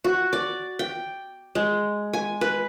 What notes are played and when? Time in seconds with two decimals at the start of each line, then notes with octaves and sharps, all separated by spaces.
0.04 F#4
0.33 D5
0.79 G5
1.55 G#3
2.13 G#5
2.41 B4